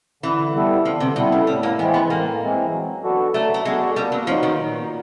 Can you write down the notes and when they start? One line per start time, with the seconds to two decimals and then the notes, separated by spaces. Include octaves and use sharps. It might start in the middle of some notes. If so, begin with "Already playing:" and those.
0.23 D3 E3
0.54 G3 B3 E4 A4
0.85 D3 F3
1.00 C3
1.16 B2 G3 B3 E4 A4
1.32 C#3
1.47 A2 G3
1.63 A#3
1.78 E3 G#3 B3 C4
1.94 B3
2.09 A2 A#3
2.41 E3 G#3 C4
2.72 F#3
3.02 B3 D4 F#4 A4
3.34 F#3 A3
3.54 A3
3.65 G#3 B3 D4 F#4 A4
3.96 A#2 G3
4.12 F#3
4.27 F3 F#3 B3 D#4 F#4
4.43 D#3
4.59 A#2